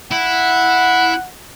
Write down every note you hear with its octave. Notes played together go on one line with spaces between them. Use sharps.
E4 F#5